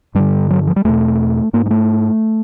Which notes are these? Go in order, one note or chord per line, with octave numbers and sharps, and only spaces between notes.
G2 D3 G3
F#3
F3
G3
E2 B2 A3
G#2 A#3
G#3
A3